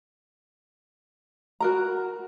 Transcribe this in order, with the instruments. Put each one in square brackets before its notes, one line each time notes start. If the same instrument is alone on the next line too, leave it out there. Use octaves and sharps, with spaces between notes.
[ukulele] F#4 A#4 A#5